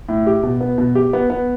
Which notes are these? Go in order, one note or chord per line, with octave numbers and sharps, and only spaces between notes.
A2
G4
B2
B3
B2
G4
B3
B3